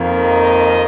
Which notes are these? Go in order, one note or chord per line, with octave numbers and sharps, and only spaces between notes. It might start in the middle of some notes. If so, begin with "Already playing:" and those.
Already playing: F2 D#3 A#3
D#5